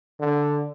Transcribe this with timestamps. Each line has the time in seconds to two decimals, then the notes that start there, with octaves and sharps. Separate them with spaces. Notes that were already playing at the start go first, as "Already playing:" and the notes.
0.20 D3